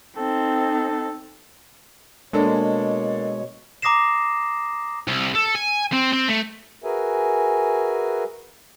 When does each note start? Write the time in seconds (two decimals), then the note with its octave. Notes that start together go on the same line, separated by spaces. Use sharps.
0.17 C4 D#4 A4
2.33 B2 G#3 A#3 D4 A4 C#5
3.82 A#5 D6 D#6 A#6 C7 E7
5.08 C2
5.35 A4
5.55 G#5
5.93 C4
6.13 C4
6.29 A3
6.84 F#4 G#4 A#4 B4 E5 G#5